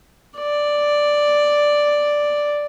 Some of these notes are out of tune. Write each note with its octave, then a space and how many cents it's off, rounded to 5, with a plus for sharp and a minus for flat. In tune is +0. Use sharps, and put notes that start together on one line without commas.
D5 +0